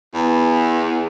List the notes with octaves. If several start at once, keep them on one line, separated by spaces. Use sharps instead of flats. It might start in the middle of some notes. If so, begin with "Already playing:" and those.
E2